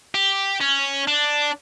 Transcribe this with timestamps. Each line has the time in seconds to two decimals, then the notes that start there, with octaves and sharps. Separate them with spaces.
0.15 G4
0.61 C#4
1.07 D4